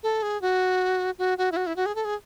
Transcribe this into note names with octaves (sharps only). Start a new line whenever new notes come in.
A4
G#4
F#4
F#4
F#4
E4
F#4
E4
F#4
G#4
A4
G#4